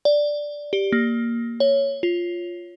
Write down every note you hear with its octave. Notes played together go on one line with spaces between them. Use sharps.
D5
G4
A#3
C#5
F4